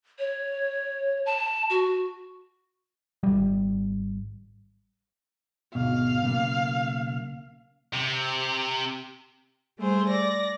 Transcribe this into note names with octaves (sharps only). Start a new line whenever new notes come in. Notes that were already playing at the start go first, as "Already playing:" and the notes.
C#5
A5
F#4
G#1 G3
D2 G#2 B2 F5
B1 C#3 A#3
C3
G3 A3 G#4 C5
D5 A#6